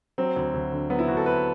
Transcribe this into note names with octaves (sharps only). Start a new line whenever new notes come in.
F#3 C4
D2
D2
D3
F#3 B3
E4
D2 F#4
A4
D2 B4